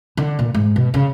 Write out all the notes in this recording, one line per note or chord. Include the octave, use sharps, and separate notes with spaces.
D3
A#2
G#2
B2
C#3